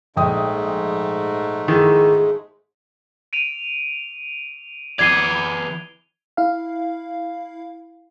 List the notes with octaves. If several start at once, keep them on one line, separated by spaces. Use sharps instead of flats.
A#1 G#2 G#3 A3 G5 D#6
D#3 E3 F4 G#4
D7 D#7 F7
E3 D5 G#6 C7 D#7 F7 G7
E4 F5